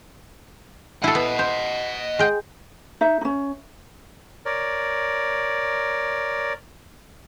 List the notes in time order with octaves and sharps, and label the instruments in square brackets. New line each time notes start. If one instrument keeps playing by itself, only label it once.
[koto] E4 A4 [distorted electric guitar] D#5 F#5
[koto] B3
C5
G#3 G5
[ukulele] D#4 E5
C#4 D#4
[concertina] A#4 C#5 D5